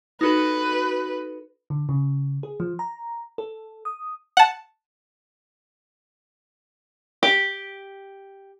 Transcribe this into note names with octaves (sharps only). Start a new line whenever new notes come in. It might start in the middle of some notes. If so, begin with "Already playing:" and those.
D#4 F#4 A4 B4
D3
C#3
G#4
F3
A#5
A4
D#6
F#5 A5
G4